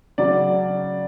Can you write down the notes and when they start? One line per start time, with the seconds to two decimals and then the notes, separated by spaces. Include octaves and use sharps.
0.18 C#3 F#3 D5